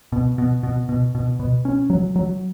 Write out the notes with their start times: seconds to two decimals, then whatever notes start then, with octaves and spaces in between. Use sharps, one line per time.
0.12 B2
0.38 B2
0.63 B2
0.89 B2
1.15 B2
1.39 B2
1.65 C#4
1.90 F#3
2.16 F#3